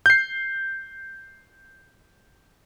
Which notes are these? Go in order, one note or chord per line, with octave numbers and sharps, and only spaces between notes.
G6 C7